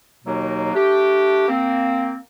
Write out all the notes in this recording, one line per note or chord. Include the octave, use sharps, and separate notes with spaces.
D#2 B2 F#3 A#3 D#4
A3 D4 G4
A#3 C4